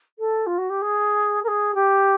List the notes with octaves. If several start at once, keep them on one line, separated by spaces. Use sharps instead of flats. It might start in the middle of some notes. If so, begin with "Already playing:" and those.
A4
F4
F#4
G4
G#4
A#4
G#4
G4